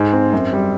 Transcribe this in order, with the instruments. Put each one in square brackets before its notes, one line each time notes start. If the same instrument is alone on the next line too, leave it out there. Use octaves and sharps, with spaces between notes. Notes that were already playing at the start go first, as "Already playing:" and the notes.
Already playing: [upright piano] G#2
C4
F#2
G3